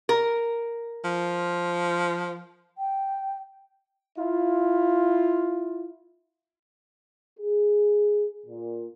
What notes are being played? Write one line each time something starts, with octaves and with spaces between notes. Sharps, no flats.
A#4
F3
G5
E4 F4
G#4
A#2